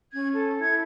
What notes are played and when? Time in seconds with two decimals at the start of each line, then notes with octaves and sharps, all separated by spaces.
0.12 C#4 G#6
0.34 A4
0.56 E4
0.62 G#6